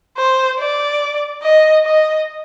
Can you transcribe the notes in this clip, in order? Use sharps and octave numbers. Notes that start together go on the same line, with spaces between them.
C5
D5
D#5
D#5